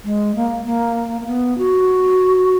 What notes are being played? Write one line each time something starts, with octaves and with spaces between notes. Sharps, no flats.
G#3
A#3
A#3
A#3
B3
F#4